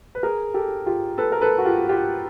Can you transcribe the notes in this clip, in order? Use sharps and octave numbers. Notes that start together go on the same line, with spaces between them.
B4
G#4 A#4
G4 A4
F4 G4
A4 B4
A#4
A4 B4
F#4
F4 G4
F4 G4